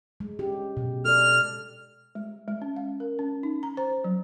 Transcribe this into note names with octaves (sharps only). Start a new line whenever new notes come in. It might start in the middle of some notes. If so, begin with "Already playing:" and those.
G#3
C#4 G4
B2
A4 D5 F6
G#3
G#3
C#4
F5
A#4
C#4
D#4
A#5
C5
F#3